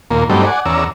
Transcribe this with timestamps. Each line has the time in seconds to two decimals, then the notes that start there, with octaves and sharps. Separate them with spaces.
0.11 D#2 A#2 A#3
0.30 G2 F#3 G3 A3 C4 D#4
0.46 D5 F#5 G#5
0.66 E2 C#4 D5 A#5 E6